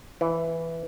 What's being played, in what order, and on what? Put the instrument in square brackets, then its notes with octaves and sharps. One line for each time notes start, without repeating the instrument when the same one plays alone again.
[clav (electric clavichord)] E3